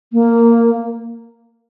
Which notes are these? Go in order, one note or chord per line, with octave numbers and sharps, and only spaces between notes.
A#3